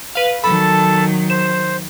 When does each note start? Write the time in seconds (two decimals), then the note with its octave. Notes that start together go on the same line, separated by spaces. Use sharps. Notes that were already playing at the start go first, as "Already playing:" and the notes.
0.15 B4 F5
0.44 D#3 F#3 A4 A5 B5
1.30 C5 E7